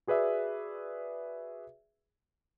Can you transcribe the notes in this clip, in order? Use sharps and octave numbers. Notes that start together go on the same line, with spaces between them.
F#4 G#4 B4 D5 E5